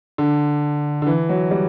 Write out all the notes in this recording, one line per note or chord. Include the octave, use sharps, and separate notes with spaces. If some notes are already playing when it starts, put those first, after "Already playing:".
D3
D3
E3
F#3
G3